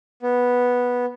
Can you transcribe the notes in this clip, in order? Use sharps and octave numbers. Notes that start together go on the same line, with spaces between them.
B3